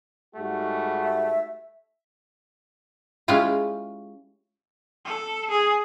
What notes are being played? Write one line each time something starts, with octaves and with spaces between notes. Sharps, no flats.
G#2 G3 A3 F#4
E5
G#3 C#4 E4 F4 G4
A4
G#4